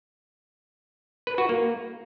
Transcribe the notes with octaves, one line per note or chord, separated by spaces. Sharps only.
B4
F#4
A#3